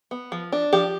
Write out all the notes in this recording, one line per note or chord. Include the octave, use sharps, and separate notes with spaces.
B3
F3
D4
F3 G4